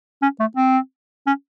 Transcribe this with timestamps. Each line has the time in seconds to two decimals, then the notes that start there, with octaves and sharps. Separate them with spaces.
0.22 C#4
0.40 A3
0.56 C4
1.27 C#4